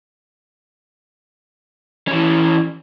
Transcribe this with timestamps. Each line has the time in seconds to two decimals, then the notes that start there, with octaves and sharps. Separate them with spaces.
2.08 E3 C#4